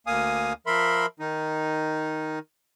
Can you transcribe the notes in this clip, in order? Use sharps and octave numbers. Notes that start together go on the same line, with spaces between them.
D2 A#3 F5 G#5 D#6
F3 A#4 E5 B5 C6
D#3 D#4